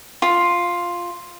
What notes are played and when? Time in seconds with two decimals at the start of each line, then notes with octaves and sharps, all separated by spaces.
0.22 F4